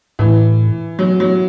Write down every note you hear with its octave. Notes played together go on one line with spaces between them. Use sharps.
A2 E3
F#3
F#3